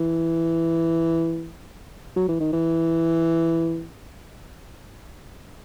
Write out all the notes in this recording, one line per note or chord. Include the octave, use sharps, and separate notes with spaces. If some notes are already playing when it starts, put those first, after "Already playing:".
Already playing: E3
F#3
E3
D#3
E3